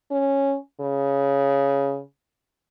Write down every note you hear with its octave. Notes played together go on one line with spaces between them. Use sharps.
C#4
C#3